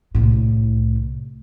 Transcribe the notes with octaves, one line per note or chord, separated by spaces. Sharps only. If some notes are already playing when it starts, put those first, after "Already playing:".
C2 A2